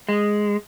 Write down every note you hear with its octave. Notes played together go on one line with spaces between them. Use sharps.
G#3